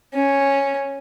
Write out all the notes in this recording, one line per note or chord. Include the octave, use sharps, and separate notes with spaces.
C#4